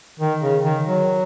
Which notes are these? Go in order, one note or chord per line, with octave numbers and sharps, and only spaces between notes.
D#3
C#3
D#3
F#3